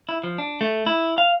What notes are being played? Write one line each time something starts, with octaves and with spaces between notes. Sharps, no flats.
E4
F3
D4
A3
E4
F5